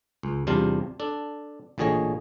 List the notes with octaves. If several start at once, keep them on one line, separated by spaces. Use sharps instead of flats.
C#2
E2 C3 G3 D4 F4 F5
D4 A4
A1 A#2 D3 G#4 C#5 D#5